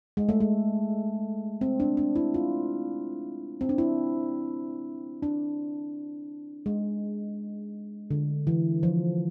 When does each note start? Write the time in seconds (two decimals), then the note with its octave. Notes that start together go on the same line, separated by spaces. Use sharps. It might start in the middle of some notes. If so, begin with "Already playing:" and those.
0.17 G#3
0.29 A3
0.40 G#3
1.61 C4
1.80 D4
1.97 D4
2.16 E4
2.34 F4
3.61 C4
3.69 D4
3.78 E4
5.23 D4
6.66 G#3
8.11 D3
8.47 E3
8.83 F3